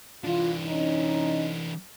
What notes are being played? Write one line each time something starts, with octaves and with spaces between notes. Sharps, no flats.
E3 D4 F4
C#4 D#4